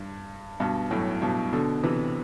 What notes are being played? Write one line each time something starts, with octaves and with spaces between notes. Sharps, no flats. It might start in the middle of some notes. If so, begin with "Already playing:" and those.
Already playing: G2
G2 B2
F#2 A2
G2 B2
B2 D3
C3 E3